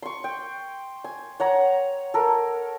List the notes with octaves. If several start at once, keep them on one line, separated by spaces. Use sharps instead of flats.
C6 C#6
G5
G#5
C#5 F#5 A#5
A4 A#4